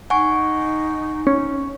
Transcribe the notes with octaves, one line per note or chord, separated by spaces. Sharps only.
D#4 F#5 G#5 C#6
C#4